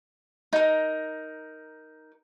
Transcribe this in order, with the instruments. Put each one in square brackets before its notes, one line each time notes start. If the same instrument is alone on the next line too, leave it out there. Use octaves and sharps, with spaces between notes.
[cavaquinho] D#4 A#4